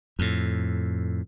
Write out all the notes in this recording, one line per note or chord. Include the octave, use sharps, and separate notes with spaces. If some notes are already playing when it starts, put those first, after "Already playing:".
F2 A2